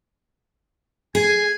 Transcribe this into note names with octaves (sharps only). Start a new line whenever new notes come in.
G#4 G#5